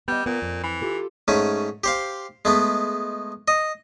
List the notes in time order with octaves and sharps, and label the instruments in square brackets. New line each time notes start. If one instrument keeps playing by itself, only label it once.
[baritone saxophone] G3 [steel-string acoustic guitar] B3 D#5
[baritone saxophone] A#2 [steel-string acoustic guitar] B3 A#4
[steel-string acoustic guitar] F2
[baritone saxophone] E3
[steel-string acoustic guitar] F4 G4 A4
[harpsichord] G#2 A3 C#4
G4 C5 F5
G#3 A3 B3
D#5